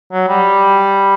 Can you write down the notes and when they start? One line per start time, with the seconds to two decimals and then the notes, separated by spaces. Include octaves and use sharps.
0.12 F#3
0.29 G3